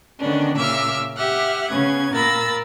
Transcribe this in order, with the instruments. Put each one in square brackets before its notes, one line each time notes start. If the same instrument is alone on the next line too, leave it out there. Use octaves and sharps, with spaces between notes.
[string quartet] D3 D#3 B3 C#4 D4
A#2 C#3 E5 D6 E6 F6
G4 E5 F#5 F6
C#3 B3 C#4 G#6
A#2 A#4 B5 E6 A6